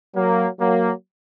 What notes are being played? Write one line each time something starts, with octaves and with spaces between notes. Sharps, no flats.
F#3 A#3
F#3 A#3